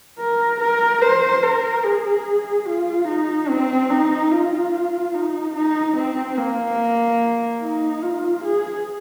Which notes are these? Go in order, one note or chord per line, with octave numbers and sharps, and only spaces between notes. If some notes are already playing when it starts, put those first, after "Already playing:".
A#4
A#4
C5
A#4
G#4
F4
D#4
C4
D#4
F4
D#4
D#4
C4
A#3
D#4
F4
G#4